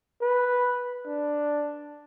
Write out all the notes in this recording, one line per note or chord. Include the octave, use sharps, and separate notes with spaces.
B4
D4